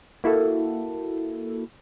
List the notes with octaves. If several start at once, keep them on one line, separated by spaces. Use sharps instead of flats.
A#3 E4 F#4 A4